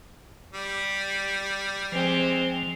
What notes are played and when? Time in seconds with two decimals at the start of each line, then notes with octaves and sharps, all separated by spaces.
0.54 G3
1.92 F3 G#3 C4